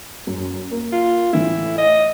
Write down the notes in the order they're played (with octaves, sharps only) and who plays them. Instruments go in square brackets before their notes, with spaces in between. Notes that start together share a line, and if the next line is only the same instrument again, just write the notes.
[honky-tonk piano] F#2
A#3
[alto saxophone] F4
[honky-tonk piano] A2 E3 [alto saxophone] E4
[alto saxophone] D#5